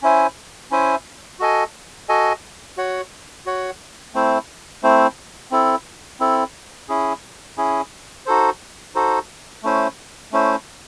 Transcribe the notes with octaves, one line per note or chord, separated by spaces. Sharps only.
C#4 E4 C5 E5 G#5
C#4 E4 C5 E5 G#5
F#4 A4 D#5 G#5
F#4 A4 D#5 G#5
F#4 C#5 F#5
F#4 C#5 F#5
A3 C4 E4 C5
A3 C4 E4 C5
C4 E4 A4
C4 E4 A4
C#4 E4 G#4
C#4 E4 G#4
D#4 F#4 A4 C5
D#4 F#4 A4 C5
A3 C#4 E4 C5
A3 C#4 E4 C5